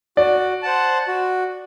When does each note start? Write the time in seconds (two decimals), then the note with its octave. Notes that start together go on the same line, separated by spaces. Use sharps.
0.17 F#4 D5
0.62 C5 F#5 A5
1.08 F#4